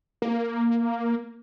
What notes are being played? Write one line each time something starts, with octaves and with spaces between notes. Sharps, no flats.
A#3